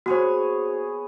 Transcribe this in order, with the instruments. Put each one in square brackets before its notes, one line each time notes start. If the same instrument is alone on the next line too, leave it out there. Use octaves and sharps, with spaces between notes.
[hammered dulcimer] B3 G#4 C#5 [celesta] F#4 C5